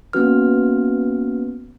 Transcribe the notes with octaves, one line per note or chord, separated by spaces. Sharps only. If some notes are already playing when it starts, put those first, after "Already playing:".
A#3 B3 C#4 F#4 B4 F6